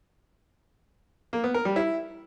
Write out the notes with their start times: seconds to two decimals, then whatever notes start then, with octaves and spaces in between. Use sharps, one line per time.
1.33 A#3
1.44 B3
1.54 A#4
1.65 G3
1.76 E4